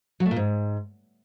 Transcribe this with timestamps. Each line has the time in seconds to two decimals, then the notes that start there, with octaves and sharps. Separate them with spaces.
0.20 F#3
0.26 A3
0.31 A#2
0.36 G#2